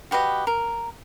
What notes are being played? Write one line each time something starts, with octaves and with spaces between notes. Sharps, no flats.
F#4 G4 B4 D#5
A#4